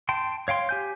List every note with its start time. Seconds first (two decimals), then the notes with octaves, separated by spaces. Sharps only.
0.09 G5 A5 C6
0.48 C#5 F5 G5 C6
0.69 G4 G#5 G6